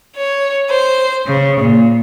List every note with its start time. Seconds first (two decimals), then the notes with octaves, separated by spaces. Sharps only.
0.17 C#5
0.69 C5
1.26 C#3
1.58 A#2